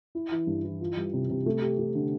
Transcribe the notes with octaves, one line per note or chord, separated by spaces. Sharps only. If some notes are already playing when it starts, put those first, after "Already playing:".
E4
E3
G2
E3
F4
G3
C3
C3
A3
G4
A3
D3